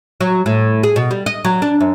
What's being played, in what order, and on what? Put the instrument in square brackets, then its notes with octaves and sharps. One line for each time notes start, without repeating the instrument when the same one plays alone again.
[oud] F#3
A2
G#4
B2
G3
D#5
F#3
D4
F#2